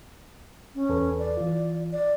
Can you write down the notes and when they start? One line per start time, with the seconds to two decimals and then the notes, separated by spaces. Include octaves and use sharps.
0.75 C#4
0.89 E2 A4 B4
1.18 D5
1.37 E3 F4
1.93 D5